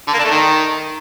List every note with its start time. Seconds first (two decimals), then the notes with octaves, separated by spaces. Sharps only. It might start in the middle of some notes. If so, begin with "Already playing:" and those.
0.07 D3
0.13 A#3
0.19 D4
0.25 A3
0.30 D#3